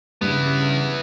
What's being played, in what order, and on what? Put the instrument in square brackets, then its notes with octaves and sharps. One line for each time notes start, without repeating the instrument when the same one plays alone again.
[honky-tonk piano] G2 [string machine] C#3 [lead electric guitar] B3 E4